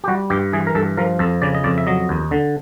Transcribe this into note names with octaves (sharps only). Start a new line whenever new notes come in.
G4
G3 F#4
G2 G4
E3 G#4
A#4
G2 A4
F3 A#4
F2 A4
C#3 D5
D#5
F2 D5
E5
F#3 D#5
D#2
D3